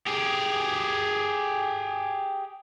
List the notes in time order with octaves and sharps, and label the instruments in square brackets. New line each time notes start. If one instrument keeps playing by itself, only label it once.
[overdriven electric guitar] G4 G#4